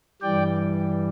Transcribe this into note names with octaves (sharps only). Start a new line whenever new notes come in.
G2 E3 G3 D5 G5